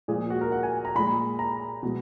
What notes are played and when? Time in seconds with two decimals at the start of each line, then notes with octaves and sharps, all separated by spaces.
0.08 A#2 F3 G#3 G#4
0.30 F#4
0.41 A#4
0.52 F#5
0.63 G#5
0.85 A#5
0.95 A#2 G#3 B5
1.39 A#5
1.83 B2 G#3